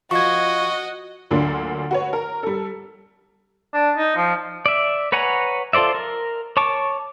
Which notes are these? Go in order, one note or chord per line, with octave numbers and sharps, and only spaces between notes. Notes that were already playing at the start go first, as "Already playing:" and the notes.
F3 F#4 D#5 C#6 G#6
D2 D3 F#3 A#3 D4 F4
F#4 B4 C#5
A#4
G3 A4
D4
D#4
F3
D5 E5
B4 C#5 F#5 G#5 A#5
F4 A4 C5 D5 E5
A#4
C#5 A5 C#6 D6